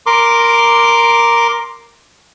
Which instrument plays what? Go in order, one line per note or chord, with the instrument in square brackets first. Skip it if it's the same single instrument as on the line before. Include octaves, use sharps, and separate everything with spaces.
[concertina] A#4 C6 D6